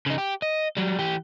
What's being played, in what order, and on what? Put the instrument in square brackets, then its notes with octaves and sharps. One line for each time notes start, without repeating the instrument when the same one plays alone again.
[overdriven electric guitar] C#3 D#4
G4
D#5
F#3 G3
E3 G4